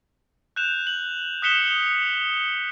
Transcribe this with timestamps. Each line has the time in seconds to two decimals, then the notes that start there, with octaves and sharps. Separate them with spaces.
0.56 F#6 G6 E7 F7
0.87 F#7
1.42 D#6 F#6 B6 C#7 E7 G7